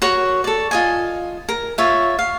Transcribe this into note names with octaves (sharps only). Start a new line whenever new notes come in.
F#4 A#4 C#5 C#6
A4 D5
F4 D#5 G#5
A#4
F4 C#5 E5
F5